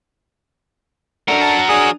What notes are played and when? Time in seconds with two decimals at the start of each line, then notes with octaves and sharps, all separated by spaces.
1.28 F#3 D4 A4 A#4 F#5 F7
1.41 A5
1.69 D4 G#4 D#6